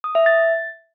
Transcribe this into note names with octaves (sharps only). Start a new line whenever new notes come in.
D#6
E5
A6